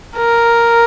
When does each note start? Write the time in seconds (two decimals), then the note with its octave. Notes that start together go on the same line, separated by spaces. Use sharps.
0.17 A#4